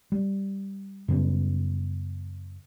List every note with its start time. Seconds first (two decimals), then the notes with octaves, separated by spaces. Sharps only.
0.12 G3
1.08 F#2 C#3 G3 B3